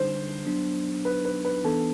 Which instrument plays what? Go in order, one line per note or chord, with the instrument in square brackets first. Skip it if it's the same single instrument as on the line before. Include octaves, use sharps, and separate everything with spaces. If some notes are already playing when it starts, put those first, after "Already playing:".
Already playing: [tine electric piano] D3 G3 D4 [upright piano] C5
[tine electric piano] F#3 B3 D4
[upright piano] B4
B4
B4
[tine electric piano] E3 B3 D4 [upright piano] A4